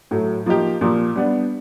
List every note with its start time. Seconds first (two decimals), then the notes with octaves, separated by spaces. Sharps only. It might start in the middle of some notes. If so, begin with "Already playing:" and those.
0.11 A2 F#3 A3
0.46 F3 A#3 D#4 G4
0.81 A#2 F3 A#3
1.16 G3 B3 D4